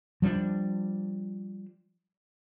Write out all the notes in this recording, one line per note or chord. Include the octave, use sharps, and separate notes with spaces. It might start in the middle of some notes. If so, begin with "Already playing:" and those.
F3 G3 A#3 D4